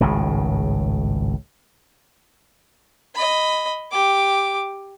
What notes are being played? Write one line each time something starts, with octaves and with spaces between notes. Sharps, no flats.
G#1 C#2 A2 C#3
D#5 B5
G4 D6